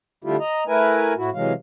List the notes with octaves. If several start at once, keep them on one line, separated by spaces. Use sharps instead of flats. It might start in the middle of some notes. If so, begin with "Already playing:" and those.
D3 G3 A3 E4 F4 G4
D#5 A#5
A3 E4 A#4 B4 G#5
A2 E4 F#4
C3 E3 F#3 G#3 F5